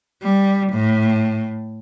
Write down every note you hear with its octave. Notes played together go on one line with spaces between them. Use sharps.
G3
A2